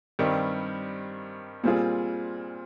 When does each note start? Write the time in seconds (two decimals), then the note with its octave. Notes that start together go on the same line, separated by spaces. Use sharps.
0.19 G2 D#3 G3 C4 G4
1.64 A#2 G3 C4 F4 G#4